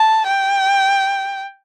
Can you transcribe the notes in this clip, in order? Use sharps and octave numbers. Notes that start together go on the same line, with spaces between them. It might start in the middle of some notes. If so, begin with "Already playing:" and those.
Already playing: A5
G5